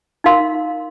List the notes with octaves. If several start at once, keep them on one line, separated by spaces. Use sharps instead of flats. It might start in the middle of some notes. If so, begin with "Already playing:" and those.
D#4 A#4 F5 C6